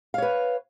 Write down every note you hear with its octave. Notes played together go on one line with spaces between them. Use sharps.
B4 C#5 F5